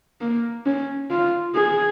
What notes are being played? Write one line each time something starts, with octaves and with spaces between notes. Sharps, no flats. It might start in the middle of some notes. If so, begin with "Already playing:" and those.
A#3
C#4
F4
G#4